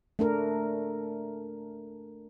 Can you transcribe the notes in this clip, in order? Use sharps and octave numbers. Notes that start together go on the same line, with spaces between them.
A3 D4 A#4